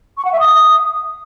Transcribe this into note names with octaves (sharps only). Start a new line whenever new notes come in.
C#6
F#5
E5
D#6